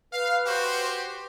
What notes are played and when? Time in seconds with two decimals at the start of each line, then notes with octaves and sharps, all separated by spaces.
0.12 B4 F5
0.46 F#4 G4 C5